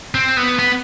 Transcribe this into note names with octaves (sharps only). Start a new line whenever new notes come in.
C4
B3
B3